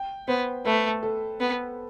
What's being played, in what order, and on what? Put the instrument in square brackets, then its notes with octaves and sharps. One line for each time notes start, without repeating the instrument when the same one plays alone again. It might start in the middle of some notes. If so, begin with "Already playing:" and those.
Already playing: [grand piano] G5
[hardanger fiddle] B3 [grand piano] C5
[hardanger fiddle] A3 [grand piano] B4
[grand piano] A4
[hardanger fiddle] B3